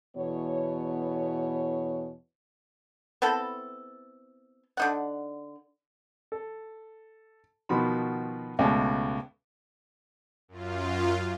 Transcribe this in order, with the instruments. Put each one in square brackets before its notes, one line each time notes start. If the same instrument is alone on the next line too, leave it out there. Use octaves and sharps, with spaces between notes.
[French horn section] E2 B2 E3 B3 C#5
[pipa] B3 C4 E4 A4
D3 D#4 F#5
[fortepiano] A4
B2 D#3 F3 F#4 B5 C6
C#2 B2 G#3 A3 G#5 A5
[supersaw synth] F#2 F4